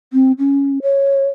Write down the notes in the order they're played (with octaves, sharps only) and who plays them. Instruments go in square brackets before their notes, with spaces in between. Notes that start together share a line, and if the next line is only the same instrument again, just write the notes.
[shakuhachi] C4
C#4
C#5